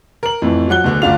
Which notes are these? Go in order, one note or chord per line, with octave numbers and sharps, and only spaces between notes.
A#4 F#7
F2 A2 E3
F3 F#3 F#5 F#6 G7
D2 B2 D3
G1 D2 D4 F4 F7